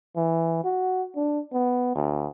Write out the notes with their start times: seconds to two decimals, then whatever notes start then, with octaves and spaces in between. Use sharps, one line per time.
0.16 E3
0.64 F#4
1.16 D4
1.53 B3
1.95 D2